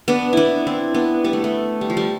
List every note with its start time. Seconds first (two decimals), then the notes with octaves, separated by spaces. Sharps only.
0.08 B3 D4
0.33 B3 D4 E4
0.67 C4 E4
0.94 B3 D4
1.24 G3 B3
1.33 A3
1.44 A3
1.81 G3
1.90 F3
1.97 G3